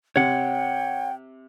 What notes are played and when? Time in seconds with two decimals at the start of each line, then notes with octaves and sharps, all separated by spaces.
0.16 C3 C#5 F#5 G5